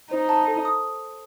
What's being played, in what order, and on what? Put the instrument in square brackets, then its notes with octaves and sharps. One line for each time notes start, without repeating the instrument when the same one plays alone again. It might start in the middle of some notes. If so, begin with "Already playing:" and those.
[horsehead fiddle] D#4 [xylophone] C5
[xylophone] A5
A4
D#6